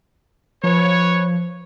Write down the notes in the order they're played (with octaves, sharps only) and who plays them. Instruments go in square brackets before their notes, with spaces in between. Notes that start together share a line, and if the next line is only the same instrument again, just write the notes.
[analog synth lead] F3 [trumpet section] B4 C#5